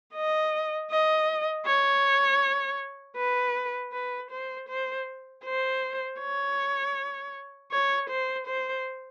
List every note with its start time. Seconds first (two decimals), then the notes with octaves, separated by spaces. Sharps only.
0.15 D#5
0.91 D#5
1.66 C#5
3.17 B4
3.93 B4
4.31 C5
4.69 C5
5.45 C5
6.20 C#5
7.72 C#5
8.10 C5
8.47 C5